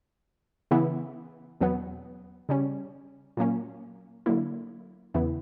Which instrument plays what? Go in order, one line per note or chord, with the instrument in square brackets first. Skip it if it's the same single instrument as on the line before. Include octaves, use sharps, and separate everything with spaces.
[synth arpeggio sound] C#3 E3 B3 E4
E2 B2 F#3 B3
C#3 G3 C#4
A#2 F#3 A#3 C#4
D3 F#3 A#3 E4
E2 C#3 E3 B3 E4